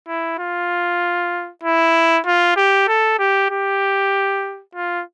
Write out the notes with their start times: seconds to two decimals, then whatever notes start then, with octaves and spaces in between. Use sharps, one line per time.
0.08 E4
0.39 F4
1.64 E4
2.26 F4
2.56 G4
2.88 A4
3.19 G4
3.51 G4
4.75 F4